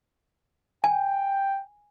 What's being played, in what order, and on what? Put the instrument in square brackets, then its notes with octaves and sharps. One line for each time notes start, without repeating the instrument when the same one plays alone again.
[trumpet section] G5 [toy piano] G#5